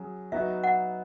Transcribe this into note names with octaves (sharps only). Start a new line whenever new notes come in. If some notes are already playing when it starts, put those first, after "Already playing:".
Already playing: F#3 C#4 G#4
F#3 B3 D#4 F#4 E5
F#5